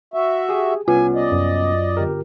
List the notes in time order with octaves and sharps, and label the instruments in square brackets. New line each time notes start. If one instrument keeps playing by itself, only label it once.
[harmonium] F#4 E5
[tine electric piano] G4 G#4
[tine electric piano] C2 B3 C#4 [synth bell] F4 [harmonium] G#5
[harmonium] D5 D#5
[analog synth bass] F#2
[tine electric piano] G1 G4 A#4